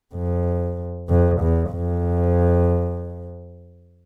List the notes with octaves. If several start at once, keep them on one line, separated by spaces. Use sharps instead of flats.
F2
F2
E2
F2